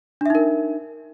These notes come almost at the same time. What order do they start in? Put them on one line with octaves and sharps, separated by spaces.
D4 E5 D#4 A#4